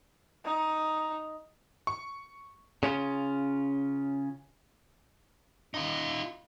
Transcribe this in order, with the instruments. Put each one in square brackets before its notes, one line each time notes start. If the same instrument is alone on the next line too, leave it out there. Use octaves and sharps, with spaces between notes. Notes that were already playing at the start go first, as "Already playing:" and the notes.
[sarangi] D#4
[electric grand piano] C#6
[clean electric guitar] C#3 C#4 F4
[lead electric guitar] D#4 F4